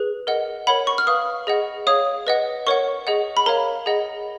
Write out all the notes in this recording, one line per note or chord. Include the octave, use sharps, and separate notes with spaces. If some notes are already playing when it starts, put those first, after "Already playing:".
Already playing: G#4 B4
A#4 D#5 F#5
A#4 C#5 F#5 B5
C#6
F6
B4 F5 D#6
G#4 D#5 F#5
G#4 C#5 F5 D#6
B4 D#5 F#5
A#4 C#5 F#5 C#6
G#4 D#5 F#5
B5
A#4 C#5 F5 A#5
G#4 D#5 F#5